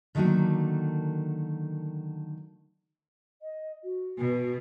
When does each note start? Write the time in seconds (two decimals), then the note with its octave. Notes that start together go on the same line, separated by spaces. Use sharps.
0.15 D3 D#3 F#3 A3 A#3 F#4
3.42 D#5
3.84 F#4
4.19 B2